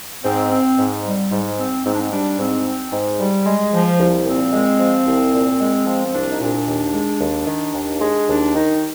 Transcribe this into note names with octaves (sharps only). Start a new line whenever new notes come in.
G#2 C4
C4
G#2
G3
G#2
C4
G#2 C4
D4
C4
G3 D4
G#2 C4
C4
G#2
G3
G#3
F3
C2
A#2 C4
G#3
F3
C2
A#2
G#3
F3 C4
C4
C2 D4
D#4
A#2 D4
D#2
G#3
D#2
D#3
D#2
G#3
D#2 D4
D#3 D#4